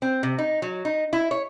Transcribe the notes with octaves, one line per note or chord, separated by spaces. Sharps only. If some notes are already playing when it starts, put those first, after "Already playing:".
C4
C3
D#4
F#3
D#4
E4
C#5